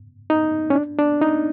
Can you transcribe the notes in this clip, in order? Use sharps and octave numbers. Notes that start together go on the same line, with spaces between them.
D#4
C#4
D4
D4
D#4